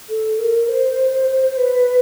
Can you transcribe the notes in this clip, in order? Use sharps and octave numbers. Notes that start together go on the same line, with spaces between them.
A4
A#4
C5
B4